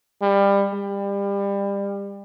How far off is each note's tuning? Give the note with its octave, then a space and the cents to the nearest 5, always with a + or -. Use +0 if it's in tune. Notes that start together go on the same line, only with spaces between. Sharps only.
G3 +25
G3 +30